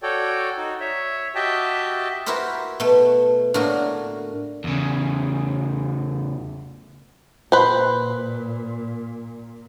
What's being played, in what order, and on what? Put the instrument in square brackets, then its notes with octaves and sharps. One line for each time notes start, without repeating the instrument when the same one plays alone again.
[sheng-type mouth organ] F#4 A4 C#5 D5 G5
D#4 F#4
C#5 E5
F#4 G4 D#5 E5 G5 A5
[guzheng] E4 F#4 G4 A#4 C5
B2 A3
A2 D3 A#3 F#4 A#4
[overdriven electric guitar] E2 C#3
[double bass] A#2 [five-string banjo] B4 C5